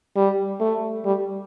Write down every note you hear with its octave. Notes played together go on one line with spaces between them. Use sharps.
G3
A3
G3